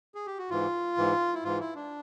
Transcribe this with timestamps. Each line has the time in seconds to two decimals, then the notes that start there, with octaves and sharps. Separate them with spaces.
0.15 G#4
0.26 G4
0.38 F#4
0.50 G#2 E3 F4
0.97 G#2 E3
1.35 E4
1.44 G#2 E3 F4
1.60 E4
1.75 D4